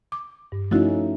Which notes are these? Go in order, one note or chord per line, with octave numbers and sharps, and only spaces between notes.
D6
G2
F3 A3 C#4 D#4 E4 F#4